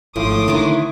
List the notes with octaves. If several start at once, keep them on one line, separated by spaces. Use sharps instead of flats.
G#1 A2 F3 C6 D6 D#6
D3 D#3 D4 E4